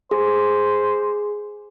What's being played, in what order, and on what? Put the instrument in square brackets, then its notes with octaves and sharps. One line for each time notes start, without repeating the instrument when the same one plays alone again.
[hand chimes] G#4 [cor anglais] C5